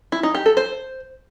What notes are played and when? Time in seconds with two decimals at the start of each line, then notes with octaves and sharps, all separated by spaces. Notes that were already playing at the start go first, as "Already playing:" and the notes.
0.12 E4
0.23 D#4
0.35 G4
0.46 A4
0.57 C5